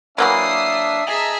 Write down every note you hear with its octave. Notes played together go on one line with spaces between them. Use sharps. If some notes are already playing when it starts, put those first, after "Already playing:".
E3 F#3 A#3 D4 E5 D#6 C7
G#4 D#5 E5 A5 A#5